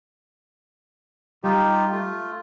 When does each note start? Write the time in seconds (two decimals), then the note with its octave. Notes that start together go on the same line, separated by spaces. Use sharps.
1.44 G3 D#4 F4 G4
1.92 A3 F4